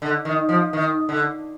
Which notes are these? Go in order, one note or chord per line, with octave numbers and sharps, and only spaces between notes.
D3
D#3
F3
D#3
D3